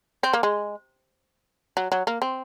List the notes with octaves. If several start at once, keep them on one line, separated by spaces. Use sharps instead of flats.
C4
A#3
G#3
F#3
F#3
A#3
C4